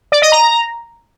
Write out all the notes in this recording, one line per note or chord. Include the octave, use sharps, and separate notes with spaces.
D5
D#5
A#5